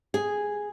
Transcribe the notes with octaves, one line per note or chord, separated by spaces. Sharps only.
G#4